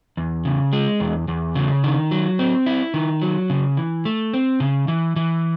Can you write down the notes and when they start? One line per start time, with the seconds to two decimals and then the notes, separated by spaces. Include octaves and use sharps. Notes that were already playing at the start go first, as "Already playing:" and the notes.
0.17 E2
0.45 C#3
0.73 G#3
1.00 E2
1.28 E2
1.55 C#3
1.84 D#3
2.11 F#3
2.39 C4
2.66 E4
2.94 D#3
3.22 F#3
3.50 C#3
3.77 E3
4.05 A3
4.34 C4
4.60 C#3
4.88 E3
5.16 E3